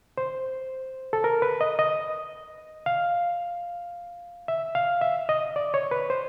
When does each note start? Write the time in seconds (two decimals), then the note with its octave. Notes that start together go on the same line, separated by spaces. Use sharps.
0.18 C5
1.13 A4
1.24 A#4
1.42 B4
1.61 D#5
1.79 D#5
2.86 F5
4.48 E5
4.75 F5
5.01 E5
5.29 D#5
5.56 D5
5.74 C#5
5.91 B4
6.10 C5